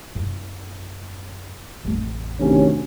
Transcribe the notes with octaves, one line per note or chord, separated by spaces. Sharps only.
F#2 E4
A1 F2
D2 C3 D#3 C#4